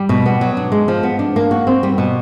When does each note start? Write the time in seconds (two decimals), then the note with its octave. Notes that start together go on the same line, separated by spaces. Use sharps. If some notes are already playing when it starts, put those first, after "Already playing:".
Already playing: G3
0.09 B2
0.26 B3
0.41 F#3
0.57 D4
0.72 G#3
0.88 F3
1.03 B3
1.19 D4
1.36 A#3
1.51 F#4
1.67 C4
1.83 G3
1.98 B2